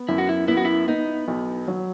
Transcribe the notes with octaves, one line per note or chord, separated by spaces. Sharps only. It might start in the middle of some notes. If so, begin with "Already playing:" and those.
Already playing: B3
F#2 E4
F#4
E4
B3 E4
F#4
E4
B3 D#4
B1
F#3